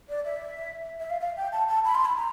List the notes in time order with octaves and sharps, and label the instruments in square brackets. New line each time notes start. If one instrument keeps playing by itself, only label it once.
[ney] D5
E5
E5
F5
F5
G5
A5
A5
B5
C6
B5
A#5